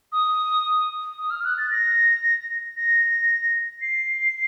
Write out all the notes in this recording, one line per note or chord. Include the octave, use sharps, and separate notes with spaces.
D#6
D#6
F6
F#6
A6
A#6
A#6
C7